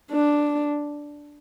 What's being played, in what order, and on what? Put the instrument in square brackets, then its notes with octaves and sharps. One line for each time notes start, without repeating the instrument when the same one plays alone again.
[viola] D4